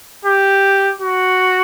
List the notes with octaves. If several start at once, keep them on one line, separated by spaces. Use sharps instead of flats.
G4
F#4